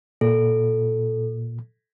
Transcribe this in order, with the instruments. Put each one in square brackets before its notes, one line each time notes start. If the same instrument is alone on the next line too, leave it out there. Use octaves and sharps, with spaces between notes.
[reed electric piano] A#2 [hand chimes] A4